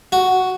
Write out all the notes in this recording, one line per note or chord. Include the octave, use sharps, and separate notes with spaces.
F#4